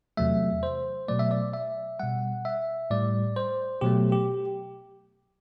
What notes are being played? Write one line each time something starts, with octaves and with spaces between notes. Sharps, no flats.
E2 C3 F#3 A3 E5
C5
B2 F#3 A3 D5
E5
D5
E5
B2 G3 F#5
E5
A2 G3 D5
C5
B2 F#3 A3 G4
G4